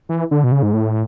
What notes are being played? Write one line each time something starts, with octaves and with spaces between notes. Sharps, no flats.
E3
D3
B2
C#3
G#2
A2